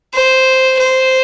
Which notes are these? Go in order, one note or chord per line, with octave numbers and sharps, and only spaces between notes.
C5
C5